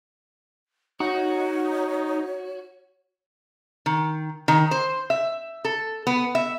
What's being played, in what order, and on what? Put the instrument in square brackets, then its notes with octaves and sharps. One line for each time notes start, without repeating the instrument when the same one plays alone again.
[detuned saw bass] D#4 [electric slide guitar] F#4 [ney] C#5
[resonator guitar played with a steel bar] D#3
D#3
C5
E5
A4
B3
E5